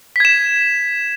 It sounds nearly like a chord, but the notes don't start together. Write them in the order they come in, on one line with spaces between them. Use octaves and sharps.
B6 G#6 E7